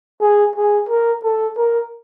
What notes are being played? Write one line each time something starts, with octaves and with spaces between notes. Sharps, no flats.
G#4
G#4
A#4
A4
A#4